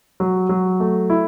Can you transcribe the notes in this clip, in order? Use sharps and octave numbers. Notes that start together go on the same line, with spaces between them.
F#3
F#3
A3
E4